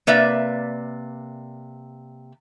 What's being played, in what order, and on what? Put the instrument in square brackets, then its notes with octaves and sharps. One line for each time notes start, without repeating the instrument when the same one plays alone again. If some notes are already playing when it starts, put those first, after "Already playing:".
[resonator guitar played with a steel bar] C3 A#3 B4 D5 E5